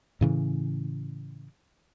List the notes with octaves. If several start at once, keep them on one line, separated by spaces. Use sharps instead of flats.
A2 C#3 E3